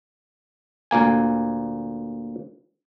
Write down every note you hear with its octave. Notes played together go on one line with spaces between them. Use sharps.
D2 A#2 A#3 G#5